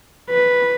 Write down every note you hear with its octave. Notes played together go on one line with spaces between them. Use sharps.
B4